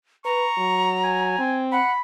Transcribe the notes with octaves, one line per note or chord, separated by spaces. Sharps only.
B4 A#5 C#6
F#3
G#5
C4
F#5 B5